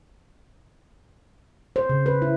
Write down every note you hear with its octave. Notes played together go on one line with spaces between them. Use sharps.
C5
C#3
B4
E4